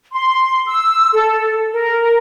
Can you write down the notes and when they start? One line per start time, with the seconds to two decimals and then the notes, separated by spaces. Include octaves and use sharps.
0.12 C6
0.67 E6
1.13 A4
1.72 A#4